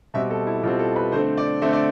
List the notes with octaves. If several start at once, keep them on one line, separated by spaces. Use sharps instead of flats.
B2 G3 C4 E5
A4
E4
B2 G3 C4 F4
A4
B4
D3 A3 C4 C5
D5
D3 A3 C4 E5
D5